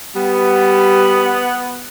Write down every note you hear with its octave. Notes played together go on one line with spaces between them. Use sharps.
G3 B3